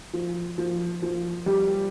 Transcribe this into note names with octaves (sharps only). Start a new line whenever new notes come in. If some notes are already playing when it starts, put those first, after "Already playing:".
F3
F3
F3
G3